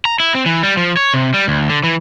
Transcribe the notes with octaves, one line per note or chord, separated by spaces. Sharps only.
A#5
E4
C4
E3
G3
F3
C#5
C3
G3
D2
D3
E3